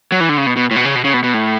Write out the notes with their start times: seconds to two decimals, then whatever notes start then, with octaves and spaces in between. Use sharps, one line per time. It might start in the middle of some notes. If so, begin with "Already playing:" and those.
0.12 F#3
0.20 E3
0.29 D3
0.37 C#3
0.47 B2
0.57 B2
0.71 A2
0.76 B2
0.85 C#3
0.95 B2
1.04 C#3
1.13 B2
1.23 B2
1.34 A2